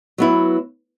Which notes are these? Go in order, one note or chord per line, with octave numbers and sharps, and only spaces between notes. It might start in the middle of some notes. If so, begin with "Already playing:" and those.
F#3 B3 E4